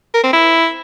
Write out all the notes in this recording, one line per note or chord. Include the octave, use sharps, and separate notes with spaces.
A#4
C4
E4